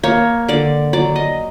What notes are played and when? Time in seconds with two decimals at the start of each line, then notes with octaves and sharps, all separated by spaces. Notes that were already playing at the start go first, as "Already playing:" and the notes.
0.03 A#3 C#5
0.48 D3 D5
0.93 F#3 D5
1.16 D#5